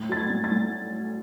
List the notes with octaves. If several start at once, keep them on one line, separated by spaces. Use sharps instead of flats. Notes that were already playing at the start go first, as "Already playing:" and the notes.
Already playing: A2
F#3 A6
G#6
A2
A6
A2